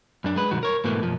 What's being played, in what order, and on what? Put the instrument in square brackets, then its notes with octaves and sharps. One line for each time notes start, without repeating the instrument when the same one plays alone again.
[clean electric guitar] F#2 D4
G#3 B4
B1 G2 D#3 F#4
A#4 C#5
G#2 B2 E3 A3 A#3
B1 F#2 F3